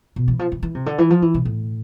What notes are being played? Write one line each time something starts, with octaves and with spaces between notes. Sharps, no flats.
B2
E3
F3
E3
E3
C3
D3
E3
F3
E3
C3
A2